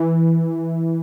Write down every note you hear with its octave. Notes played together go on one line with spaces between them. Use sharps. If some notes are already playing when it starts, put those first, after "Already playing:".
Already playing: E3